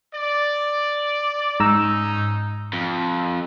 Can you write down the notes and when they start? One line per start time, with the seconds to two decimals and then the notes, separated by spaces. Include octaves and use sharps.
0.13 D5
1.60 G#2 C#4 D#4 A#5 E6
2.73 F2